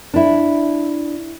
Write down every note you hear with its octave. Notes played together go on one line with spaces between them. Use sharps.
D4 E4